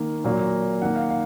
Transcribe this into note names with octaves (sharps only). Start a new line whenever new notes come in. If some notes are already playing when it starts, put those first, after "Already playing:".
Already playing: D#3 A#3
A#2 F#3 A#3
D#3 A#3 F#5
F5
F5